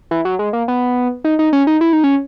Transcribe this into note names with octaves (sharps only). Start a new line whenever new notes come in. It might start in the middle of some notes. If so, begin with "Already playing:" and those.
E3
F#3
G#3
A#3
B3
D#4
D#4
C#4
D#4
E4
D#4
C#4